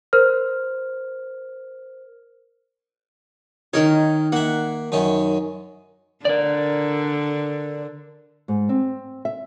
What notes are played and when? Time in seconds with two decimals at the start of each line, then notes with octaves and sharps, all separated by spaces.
0.13 A#4 C5 F6
3.73 D#3 D#4 A#4 C#5
4.32 A#3 E5 F#5
4.92 F#2 D#3 C#4
6.25 D3 A#4 D5
8.48 G#2
8.69 C4
9.25 E5